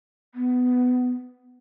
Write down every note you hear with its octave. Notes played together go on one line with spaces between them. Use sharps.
B3